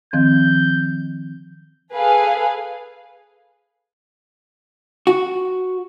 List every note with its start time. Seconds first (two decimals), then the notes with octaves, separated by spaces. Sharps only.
0.13 D#3 F3 C4 G6
1.92 G#4 A4 B4 F5 G#5
5.07 F#4